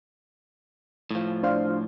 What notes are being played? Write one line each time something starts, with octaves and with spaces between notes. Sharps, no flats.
A2 F3
D4 C5 F5